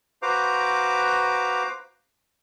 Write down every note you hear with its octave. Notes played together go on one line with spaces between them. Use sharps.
F#4 B4 C5 F5 A#5 D6